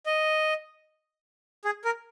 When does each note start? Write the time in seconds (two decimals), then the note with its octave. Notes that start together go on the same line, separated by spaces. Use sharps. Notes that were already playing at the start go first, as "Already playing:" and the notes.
0.06 D#5
1.65 G#4
1.85 A#4